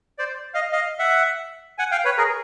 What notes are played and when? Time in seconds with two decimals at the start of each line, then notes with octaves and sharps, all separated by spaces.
0.19 C5 D5
0.54 D#5 F5
0.72 D#5 F5
0.99 E5 F#5
1.78 F#5 G#5
1.92 F5 G5
2.05 B4 C#5
2.18 G#4 A#4